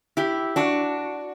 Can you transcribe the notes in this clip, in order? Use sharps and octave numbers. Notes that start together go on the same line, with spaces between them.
E4 G4
D4 F#4